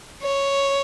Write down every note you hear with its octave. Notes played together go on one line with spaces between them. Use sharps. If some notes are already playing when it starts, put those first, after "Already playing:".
C#5